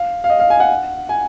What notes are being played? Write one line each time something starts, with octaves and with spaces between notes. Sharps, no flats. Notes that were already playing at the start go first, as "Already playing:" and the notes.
Already playing: F5
F5
D#5
F5
G#5
F#5
G#5